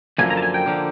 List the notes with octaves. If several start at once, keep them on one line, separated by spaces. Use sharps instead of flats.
F#2 D3 F3 A#3 G#5
A#5
A5
G#5
G5
D3 F3 A#3